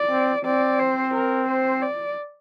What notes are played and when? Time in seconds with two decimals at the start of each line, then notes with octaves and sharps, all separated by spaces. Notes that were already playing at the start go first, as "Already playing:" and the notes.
Already playing: D5
0.10 C4
0.45 C4 D5
0.79 C5
1.14 A#4
1.48 C5
1.82 D5